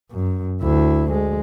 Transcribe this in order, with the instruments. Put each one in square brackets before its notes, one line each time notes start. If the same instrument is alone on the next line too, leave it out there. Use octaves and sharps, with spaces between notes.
[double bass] F#2
D2 E4
G#3